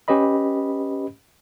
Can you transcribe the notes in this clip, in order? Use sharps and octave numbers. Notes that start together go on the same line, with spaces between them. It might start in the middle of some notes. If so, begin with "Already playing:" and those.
C#4 G4 B4 D#5 B5